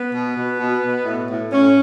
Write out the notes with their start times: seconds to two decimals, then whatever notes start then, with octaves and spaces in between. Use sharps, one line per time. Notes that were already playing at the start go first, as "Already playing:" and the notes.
Already playing: B3
0.13 B2
0.36 B2
0.59 B2
0.83 B2
1.05 A2
1.29 A2
1.52 A2 C#4